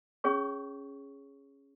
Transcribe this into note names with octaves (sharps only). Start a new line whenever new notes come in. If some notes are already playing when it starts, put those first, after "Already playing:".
C#4 G#4 C#5 C#6